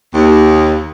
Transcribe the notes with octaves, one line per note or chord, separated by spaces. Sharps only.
D#2